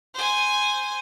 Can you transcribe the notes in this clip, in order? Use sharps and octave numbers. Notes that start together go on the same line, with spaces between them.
C5 G#5